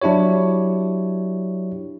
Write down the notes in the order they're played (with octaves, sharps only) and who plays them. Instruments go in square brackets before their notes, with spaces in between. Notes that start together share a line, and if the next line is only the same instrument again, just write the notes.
[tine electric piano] F#3 D4 E4 G4 C#5